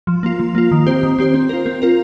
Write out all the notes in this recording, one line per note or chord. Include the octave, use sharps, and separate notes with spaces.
F3
A#3 F4
F3
A#3 F4
D#3
C4 G4 C5
D#3
C4 G4 C5
C4
F4 A#4
C4
F4 A#4